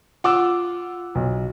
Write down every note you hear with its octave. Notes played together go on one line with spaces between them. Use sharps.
F4 F#5 D6 E6
B1